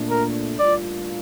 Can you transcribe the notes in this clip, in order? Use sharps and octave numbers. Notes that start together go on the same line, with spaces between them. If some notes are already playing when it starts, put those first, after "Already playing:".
Already playing: A#2 A3 D4
A#4
A2 G3 A#3 D4 F4 D5